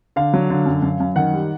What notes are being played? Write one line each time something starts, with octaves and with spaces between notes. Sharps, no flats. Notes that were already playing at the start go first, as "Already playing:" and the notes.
D3 F5
F#3
D3
F#2
F#2
F#2
D#3 F#5
G3